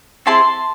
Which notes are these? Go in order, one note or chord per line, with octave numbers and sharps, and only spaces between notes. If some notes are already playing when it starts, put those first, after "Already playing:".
C4 E4 G#4 A5 C6